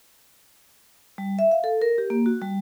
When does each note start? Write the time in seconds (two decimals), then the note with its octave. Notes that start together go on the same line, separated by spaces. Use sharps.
1.18 G3
1.39 E5
1.51 F5
1.64 A4
1.82 A#4
1.98 G4
2.10 A#3
2.26 F#4
2.42 G3